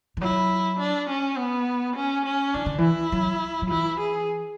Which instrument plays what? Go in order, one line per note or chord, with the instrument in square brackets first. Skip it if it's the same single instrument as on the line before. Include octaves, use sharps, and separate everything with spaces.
[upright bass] E3
[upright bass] F#3 [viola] E4
[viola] D4
C#4
B3
C#4
C#4
[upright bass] E3 [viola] D4
[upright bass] D3
[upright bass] E3 [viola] E4
[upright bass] F#3
F#3
[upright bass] E3 [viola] E4
[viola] G#4